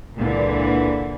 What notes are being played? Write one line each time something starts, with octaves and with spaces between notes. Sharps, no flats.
C#2 A#2 D3 E3